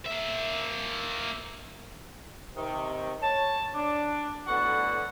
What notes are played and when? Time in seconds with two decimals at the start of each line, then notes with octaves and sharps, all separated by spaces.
0.06 A#3 E5
2.55 C3 D#3
3.22 C#5 A5
3.74 D4
4.47 A2 D3 B3 F#4 A4 F#5